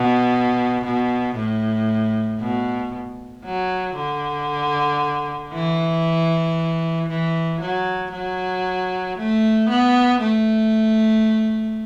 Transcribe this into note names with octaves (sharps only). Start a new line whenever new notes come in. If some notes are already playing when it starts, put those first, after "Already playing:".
Already playing: B2
B2
A2
B2
F#3
D3
E3
E3
F#3
F#3
A3
B3
A3